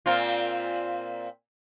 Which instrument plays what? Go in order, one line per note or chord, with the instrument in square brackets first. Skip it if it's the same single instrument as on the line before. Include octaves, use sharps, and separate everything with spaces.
[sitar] A#2 C4 F4